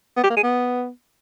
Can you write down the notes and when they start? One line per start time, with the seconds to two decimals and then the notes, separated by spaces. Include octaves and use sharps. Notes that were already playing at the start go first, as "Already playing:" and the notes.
0.17 B3
0.24 G4
0.30 A#3
0.37 G#4
0.43 B3